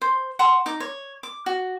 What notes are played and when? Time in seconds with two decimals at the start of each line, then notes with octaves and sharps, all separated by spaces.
0.02 C5
0.39 F#5 A5 C6 C#6
0.66 D#4 D6
0.80 C#5
1.23 D6
1.46 F#4